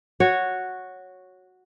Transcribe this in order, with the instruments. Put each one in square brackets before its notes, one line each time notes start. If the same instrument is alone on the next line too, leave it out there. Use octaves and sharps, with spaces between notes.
[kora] F#4 C#5